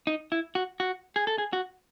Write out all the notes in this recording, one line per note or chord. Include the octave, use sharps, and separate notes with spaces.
D#4
E4
F#4
F#4
G#4
A4
G#4
F#4